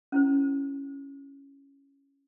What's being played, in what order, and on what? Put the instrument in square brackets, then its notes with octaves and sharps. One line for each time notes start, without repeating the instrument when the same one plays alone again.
[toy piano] C#4 E4 C5